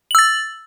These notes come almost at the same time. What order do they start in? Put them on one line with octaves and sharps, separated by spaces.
F#7 E6 A6